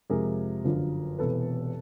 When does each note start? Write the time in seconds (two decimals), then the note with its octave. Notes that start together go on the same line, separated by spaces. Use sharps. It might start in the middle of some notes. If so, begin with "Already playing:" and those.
0.10 F2 C3 F3 G#3 G#4 A#4
0.65 G1 F#2 D3 F3
1.19 E1 E2 C3 A4 B4